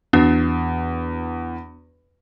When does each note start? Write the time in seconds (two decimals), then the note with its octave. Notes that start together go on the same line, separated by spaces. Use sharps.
0.13 E2 B3 D4 F#4